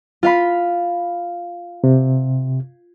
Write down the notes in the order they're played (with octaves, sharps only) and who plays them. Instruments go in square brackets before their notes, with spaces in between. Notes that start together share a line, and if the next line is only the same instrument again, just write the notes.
[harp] F4 F5 B5
[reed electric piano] C3